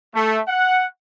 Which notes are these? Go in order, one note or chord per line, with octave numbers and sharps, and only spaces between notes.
A3
F#5